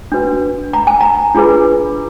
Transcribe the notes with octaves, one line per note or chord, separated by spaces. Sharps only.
D4 F#4 B4
A#5
G#5
A#5
D4 F4 G#4 B4